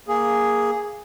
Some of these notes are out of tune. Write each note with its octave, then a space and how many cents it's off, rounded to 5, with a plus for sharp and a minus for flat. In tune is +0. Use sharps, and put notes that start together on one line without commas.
A#3 +0 G#4 +0